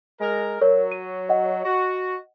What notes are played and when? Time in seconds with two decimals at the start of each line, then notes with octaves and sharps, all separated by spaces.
0.21 G#3 A#4
0.61 F#3 A#4 C#5 D5
0.92 D#7
1.29 D#5 F#5
1.65 F#4